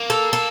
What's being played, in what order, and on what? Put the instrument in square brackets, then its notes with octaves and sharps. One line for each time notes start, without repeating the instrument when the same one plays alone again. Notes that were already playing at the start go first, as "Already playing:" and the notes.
Already playing: [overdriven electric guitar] A#3
[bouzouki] A4
A4